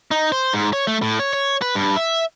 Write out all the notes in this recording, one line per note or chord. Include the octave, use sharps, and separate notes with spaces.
D#4
C5
G#2
C#5
A3
A2
C#5
C#5
B4
G2
E5